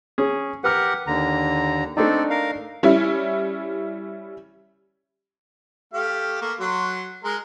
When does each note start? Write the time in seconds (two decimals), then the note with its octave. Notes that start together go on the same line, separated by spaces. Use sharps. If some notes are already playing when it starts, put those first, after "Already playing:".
0.18 C#4 G#4
0.64 G4 A#4 B4 F#5 F6
1.07 D#2 D3 A#5
1.97 A3 C4 D4 D#4 A4 D5
2.30 A#4 F5
2.83 G3 C#4 E4
5.93 A3 G4 F5
6.41 A3 A#3
6.60 F#3 C6
7.24 G#3 A#4